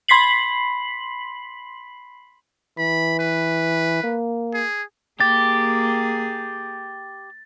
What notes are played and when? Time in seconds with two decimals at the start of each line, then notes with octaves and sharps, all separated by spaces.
0.08 B5 C6 B6 C7 F#7
2.78 E3 B5
3.19 B4
4.04 A#3
4.54 G#4
5.20 A#3 G4 G#4 A6